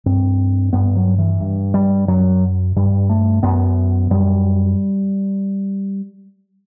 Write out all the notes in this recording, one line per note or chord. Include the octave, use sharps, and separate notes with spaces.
G2 C4
G2 B3
F#3
E3
G2
G3
F#2 F#3
G2 G3
A3
F#2 B3
F#2 G3